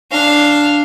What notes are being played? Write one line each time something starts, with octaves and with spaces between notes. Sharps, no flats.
D4 F5